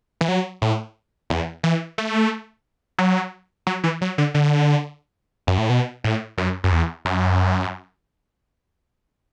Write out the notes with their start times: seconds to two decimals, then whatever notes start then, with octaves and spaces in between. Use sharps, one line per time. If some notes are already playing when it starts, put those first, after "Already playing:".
0.21 E3
0.28 F#3
0.62 A2
1.30 E2
1.63 E3
1.98 A3
2.98 F#3
3.67 F#3
3.84 E3
4.01 F#3
4.18 D3
4.34 D3
5.47 F#2
5.58 A2
5.70 B2
6.04 A2
6.38 F#2
6.64 F#2
6.72 E2
7.05 F#2